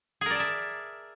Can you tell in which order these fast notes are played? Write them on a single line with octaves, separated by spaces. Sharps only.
G#4 A#4 D5 A5 E5